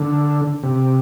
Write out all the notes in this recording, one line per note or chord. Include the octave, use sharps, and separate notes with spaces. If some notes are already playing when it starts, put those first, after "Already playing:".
Already playing: D3
C3